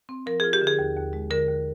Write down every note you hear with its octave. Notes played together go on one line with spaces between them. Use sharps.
C4
F3 A#4
F4 G#4
G4
D3
G#4
D#2
D#2
G#3
D3 A#4
D#2